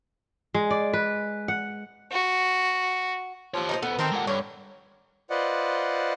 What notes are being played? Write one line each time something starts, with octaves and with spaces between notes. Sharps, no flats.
G#3
D5
B4
F#5
F#4
F3 G4 C#5
D#4 B4 C5
B3 A4 C5
D#3 C4 G4 A4 A#4
A#2 G#3 F#5
G2 D3 C#5
F4 B4 C5 D5 D#5 F#5